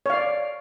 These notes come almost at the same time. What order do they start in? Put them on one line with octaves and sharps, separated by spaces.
C#5 F5 D5